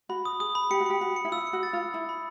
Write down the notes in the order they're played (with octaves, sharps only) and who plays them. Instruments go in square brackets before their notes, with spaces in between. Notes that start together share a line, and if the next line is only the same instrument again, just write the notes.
[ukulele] F#4 [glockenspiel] B5
[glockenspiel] D#6
[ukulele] G#4 [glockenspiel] D#6
[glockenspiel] B5
[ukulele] G4 [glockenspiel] C#7
[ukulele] F#4
[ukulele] G4 [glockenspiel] C#7
[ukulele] F#4 [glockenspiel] B5
[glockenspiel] C#7
[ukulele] E4
[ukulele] F4 [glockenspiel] E6
[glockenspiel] C#7
[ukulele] F#4
[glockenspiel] A6
[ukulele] F4
[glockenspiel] A6
[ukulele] E4 [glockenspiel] B5
[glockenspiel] B5